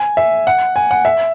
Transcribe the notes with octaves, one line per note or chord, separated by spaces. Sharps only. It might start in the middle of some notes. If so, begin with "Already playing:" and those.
Already playing: G#5
E5
F#5
G#5
F#5
E5